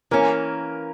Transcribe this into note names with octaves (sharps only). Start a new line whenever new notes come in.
E3 A#3 C#4 A#4